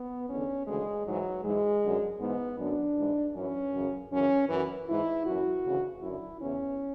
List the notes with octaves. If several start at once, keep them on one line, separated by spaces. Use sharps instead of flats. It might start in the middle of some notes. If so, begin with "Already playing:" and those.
Already playing: B3
E2 D3 C#4
D2 C#3 E3 G#3
G#2 E3 F#3
G#2 E3 G#3
F#2 D3
G#2 E3 B3
F#2 D3 D4
G#2 E3
F#2 E3 C#4
F#2 C#3 E3
F#2 C#3 E3 C#4
F#2 E3
G#2 E3 E4
F#2 E3 F#4
D2 C#3 E3
F#2 D3 E4
E2 C#3 E3 C#4